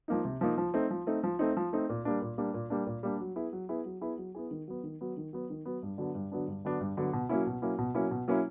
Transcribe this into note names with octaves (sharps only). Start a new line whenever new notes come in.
F3 A#3 D#4
C3
F3 A#3 D#4
F3
A3 C4 D#4
F3
A3 C4 D#4
F3
A3 C4 D#4
F3
A3 C4 D#4
A#2
G3 A#3 D4
A#2
G3 A#3 D4
A#2
G3 A#3 D4
A#2
G3 A#3 D4
F#3
B3 E4 G#4
F#3
B3 E4 G#4
F#3
B3 E4 G#4
F#3
B3 E4 G#4
D#3
F#3 B3
D#3
F#3 B3
D#3
F#3 B3
D#3
F#3 B3
G2
D3 F#3 B3 D4
G2
D3 F#3 B3 D4
G2
D3 F#3 B3 D4
G2
D3 F#3 B3 D4
B2
F#3 A#3 C#4 E4
B2
F#3 A#3 C#4 E4
B2
F#3 A#3 C#4 E4
B2
F#3 A#3 C#4 E4